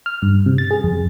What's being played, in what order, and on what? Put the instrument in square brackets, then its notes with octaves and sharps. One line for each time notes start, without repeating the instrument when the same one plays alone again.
[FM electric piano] F6
G2
C3
A6
G#4
F2